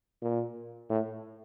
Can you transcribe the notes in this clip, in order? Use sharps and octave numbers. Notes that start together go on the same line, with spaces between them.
A#2
A2